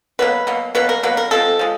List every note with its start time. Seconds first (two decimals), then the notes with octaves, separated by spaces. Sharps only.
0.19 B2 F#3 A#3 B4
0.47 B2 F#3 A#3
0.75 B2 F#3 A#3 B4
0.89 A#4
1.03 B2 F#3 A#3 B4
1.17 A#4
1.31 F3 G#3 C4 A4
1.59 F3 G#3